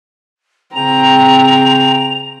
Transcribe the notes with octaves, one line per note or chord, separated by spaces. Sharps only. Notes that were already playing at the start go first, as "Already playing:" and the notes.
C#3 C4 G#4 G5 A#5 F7